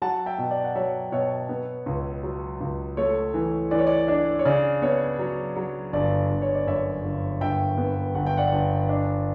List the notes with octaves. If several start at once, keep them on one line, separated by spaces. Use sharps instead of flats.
F#3 F#5 A5
E5 G5
B2
D5
F#5
F#3 C#5 E5
B2 C#5 E5
B3
C#2
F#3
C#2
A3 C#5
E3
E3 D5
C#5
D5
D4
C#5
C#3 D5
B3 C#5
F#3
F#3
G1 D5
G1
C#5
D5
F#2 C#5 E5
G1
G1 E5 G5
B3
G1 F#5
G5
D5 F#5
G1
D4